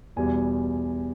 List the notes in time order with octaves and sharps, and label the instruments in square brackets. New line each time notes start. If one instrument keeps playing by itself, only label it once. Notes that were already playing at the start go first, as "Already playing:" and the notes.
[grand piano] E2 B2 G3 G#5